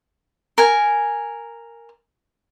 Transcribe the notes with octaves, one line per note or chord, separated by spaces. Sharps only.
A#4 G#5